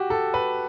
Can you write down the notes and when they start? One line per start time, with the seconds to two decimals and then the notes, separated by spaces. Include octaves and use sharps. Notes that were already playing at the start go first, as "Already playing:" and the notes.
Already playing: F#4 G4
0.10 A4
0.34 B4